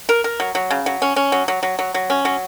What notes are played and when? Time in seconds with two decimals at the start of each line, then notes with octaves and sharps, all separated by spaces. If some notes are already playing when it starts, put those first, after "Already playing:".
0.09 A#4
0.24 A#4
0.40 F#3
0.55 F#3
0.71 C#3
0.86 F#3
1.02 C#4
1.16 C#4
1.32 F#3
1.48 F#3
1.63 F#3
1.79 F#3
1.94 F#3
2.10 C#4
2.25 F#3